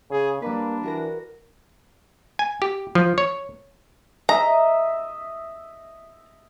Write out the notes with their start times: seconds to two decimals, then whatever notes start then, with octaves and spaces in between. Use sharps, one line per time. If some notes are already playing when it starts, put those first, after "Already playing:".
0.11 C#3 G#4
0.42 G3 A#3 D4 B4
0.83 E3 F#4 A#4 A#6
2.39 G#5
2.62 G4
2.95 F3
3.18 C#5
4.29 D#5 E5 A#5